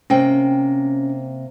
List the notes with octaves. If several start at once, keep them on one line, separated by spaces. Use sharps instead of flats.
C3 A#3 C#4 G5